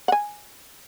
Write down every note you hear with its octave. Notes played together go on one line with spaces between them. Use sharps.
F#5 G#5